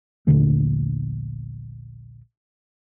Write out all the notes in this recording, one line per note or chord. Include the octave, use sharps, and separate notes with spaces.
A#1 D#2 D3 A3